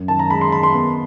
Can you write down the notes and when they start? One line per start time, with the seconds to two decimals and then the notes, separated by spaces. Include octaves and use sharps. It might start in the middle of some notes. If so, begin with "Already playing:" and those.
Already playing: F#2
0.08 D#3 A5
0.19 A#5
0.30 G#3 B5
0.41 C6
0.52 D#3 B5
0.63 C6
0.74 B3